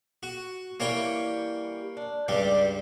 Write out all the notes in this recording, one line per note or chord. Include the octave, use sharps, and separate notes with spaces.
F#4
E3 G3 A#3 C#5 G5
D4
C#2 G2 G3 G4 D5